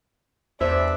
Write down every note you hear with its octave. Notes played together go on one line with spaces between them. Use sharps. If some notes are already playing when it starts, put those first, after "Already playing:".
E2 D4 C5 E5